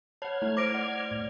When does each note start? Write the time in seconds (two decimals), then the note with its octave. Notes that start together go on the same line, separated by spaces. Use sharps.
0.22 C#5 F#5 A5 F6 G#6
0.42 A3 E4
0.57 C5 D6 A#6 D7
0.74 D5 F#5
1.11 A2